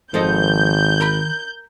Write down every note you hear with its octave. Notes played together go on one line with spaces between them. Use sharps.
G#1 D#3 F3 A4 D#5 G6
A#4 A#5 B5